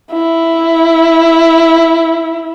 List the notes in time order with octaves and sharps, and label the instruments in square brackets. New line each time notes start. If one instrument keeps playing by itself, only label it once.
[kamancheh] E4